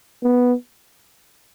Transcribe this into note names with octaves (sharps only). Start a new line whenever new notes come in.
B3